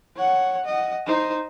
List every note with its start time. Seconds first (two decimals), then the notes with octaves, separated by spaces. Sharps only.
0.16 C#5 F#5
0.65 D#5 F#5
1.06 D#4 C5